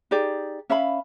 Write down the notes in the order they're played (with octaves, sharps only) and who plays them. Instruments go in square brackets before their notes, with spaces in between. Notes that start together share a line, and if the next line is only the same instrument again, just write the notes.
[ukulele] D#4 G4 G#4 D5
C#4 E5 F5 B5